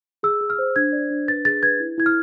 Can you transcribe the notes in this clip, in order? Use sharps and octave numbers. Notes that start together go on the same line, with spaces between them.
G#4 E6
G#4
F6
C5
D4 G#6
D5
D4
B4 A6
G#4 A6
B4 G#6
E4
E4 G#6
F6